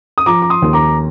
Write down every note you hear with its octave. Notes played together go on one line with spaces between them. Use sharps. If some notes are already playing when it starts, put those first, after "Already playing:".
D#6
F3 A#5 D6
D6
C6 D#6
D#2
A#5 D6